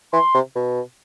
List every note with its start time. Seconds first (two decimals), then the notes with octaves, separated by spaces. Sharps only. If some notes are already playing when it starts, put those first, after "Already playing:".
0.13 E3 C6
0.35 C3
0.55 B2